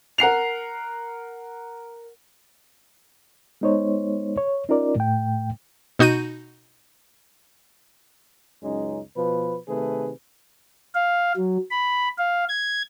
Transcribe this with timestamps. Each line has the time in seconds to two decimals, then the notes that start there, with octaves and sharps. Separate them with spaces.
0.18 A#4 F#5 C7 F7
3.61 G#3 B3 D#4 C5 C#5
4.37 C#5
4.69 C#4 D#4 F4 A#4 D5
4.96 A2 A3 G5
5.99 B2 D#4 F#4 G6 D#7
8.63 C#2 F#2 G#3 C#4 D#4
9.17 B2 F3 B4
9.69 C3 D#3 A3 G#4 B4
10.95 F5
11.36 F#3
11.71 B5
12.18 F5
12.49 G#6